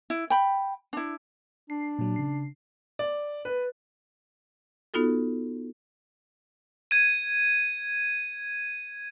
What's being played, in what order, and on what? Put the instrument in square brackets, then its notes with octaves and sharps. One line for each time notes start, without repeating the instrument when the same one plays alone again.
[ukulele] E4
G5 B5
D4 E4
[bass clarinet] D4 [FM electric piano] C7
[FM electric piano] A#2 F#3
C#3 C7
[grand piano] D5
B4
[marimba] B3 D#4 F4 F#4 A4
[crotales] G#6 D#7